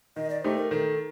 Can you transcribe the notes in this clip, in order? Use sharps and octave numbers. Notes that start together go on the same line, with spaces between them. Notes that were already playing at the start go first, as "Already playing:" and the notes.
D#3 D#5
D5
A3 D#4 G4 C5
A#4
D#3 A4